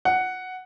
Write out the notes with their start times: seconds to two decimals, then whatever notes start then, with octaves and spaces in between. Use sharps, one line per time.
0.05 F#5